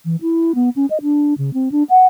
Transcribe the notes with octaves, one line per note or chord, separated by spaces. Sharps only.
E3
E4
B3
C#4
D#5
D4
C#3
C4
D4
F#5